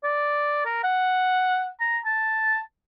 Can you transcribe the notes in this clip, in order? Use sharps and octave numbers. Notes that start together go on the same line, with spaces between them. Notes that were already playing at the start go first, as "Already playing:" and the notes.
D5
A#4
F#5
A#5
A5